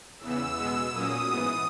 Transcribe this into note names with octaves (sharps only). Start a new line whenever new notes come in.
E2 C#3 E3 B3 E6
B2 G#3 B3
A#2 F#3 A#3 C#4 D#6
G#2 E3 B3